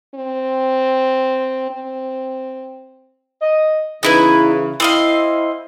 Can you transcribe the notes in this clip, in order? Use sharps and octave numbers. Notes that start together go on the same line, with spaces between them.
C4
C4
D#5
C#3 E3 D#4 E4 B4
C4 E4 D#5 F5